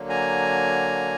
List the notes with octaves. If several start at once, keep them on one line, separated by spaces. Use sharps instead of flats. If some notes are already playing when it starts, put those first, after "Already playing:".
Already playing: D3 F#3 A#3
G#5 A#5